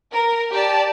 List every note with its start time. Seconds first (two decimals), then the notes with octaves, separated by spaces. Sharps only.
0.12 A#4
0.50 G4 D5 A5